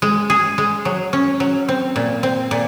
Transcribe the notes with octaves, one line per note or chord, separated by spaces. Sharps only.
G#3
G#4
G#3
F#3
C#4
F#3
C4
A#2
C4
A#2